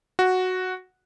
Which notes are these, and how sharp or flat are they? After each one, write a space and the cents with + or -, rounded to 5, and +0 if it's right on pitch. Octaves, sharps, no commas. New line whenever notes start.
F#4 -5